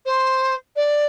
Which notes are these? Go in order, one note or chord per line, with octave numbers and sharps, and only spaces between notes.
C5
D5